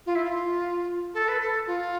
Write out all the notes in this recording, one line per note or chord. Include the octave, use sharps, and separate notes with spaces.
F4
E4
F4
A4
B4
A4
F4